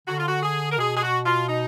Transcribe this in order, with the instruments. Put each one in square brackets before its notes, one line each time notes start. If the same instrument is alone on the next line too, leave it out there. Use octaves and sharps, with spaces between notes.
[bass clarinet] D3 [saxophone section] F#4
[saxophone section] F4
F#4
G#4
A#4
[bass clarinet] B2 [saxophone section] G#4
[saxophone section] G#4
F#4
F4
D#4